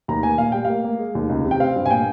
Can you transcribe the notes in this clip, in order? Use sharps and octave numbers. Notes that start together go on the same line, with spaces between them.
D#2 A#5
A#3 G#5
A#2 F5
G3 G5
A#3 F5
A#3
G#3
D#2
C#2
C3
G5
C4 F5
G2
G#5
A#2 G5